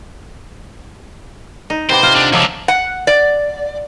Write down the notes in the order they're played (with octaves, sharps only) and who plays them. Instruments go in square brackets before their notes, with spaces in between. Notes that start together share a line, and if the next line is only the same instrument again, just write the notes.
[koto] D#4
[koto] C3 B3 G4 [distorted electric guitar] C5
[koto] C3 F4 G5
[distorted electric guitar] D3 D4
[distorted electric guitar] C#2 D3 [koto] F3 F#3 E5
[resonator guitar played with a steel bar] F#5
D5